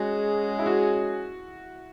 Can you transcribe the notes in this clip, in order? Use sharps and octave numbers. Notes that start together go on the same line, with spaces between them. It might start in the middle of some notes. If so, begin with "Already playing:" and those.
Already playing: G#3 C#4 F#4 G#4
E4
F#4